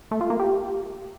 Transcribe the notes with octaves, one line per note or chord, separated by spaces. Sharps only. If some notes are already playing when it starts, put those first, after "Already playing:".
A3
F4
A#3
G4